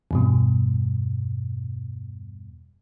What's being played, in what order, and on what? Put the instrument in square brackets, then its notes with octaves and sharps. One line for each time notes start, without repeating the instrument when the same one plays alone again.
[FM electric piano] E2 G2 B2